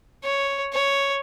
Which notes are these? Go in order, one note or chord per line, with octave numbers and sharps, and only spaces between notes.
C#5
C#5